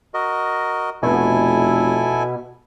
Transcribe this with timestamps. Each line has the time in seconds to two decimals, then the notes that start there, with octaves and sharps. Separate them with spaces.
0.14 F#4 A#4 D#5
1.03 F1 B2 E4 A4 G#5